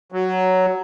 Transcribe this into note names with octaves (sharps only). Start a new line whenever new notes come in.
F#3